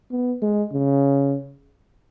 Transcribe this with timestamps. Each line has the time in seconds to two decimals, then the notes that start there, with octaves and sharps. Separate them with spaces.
0.11 B3
0.42 G#3
0.72 C#3